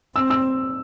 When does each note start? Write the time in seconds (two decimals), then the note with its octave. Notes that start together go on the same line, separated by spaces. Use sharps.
0.16 C4 E6
0.30 E6